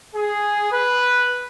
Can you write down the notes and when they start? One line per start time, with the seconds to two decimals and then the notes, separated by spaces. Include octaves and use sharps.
0.15 G#4
0.72 B4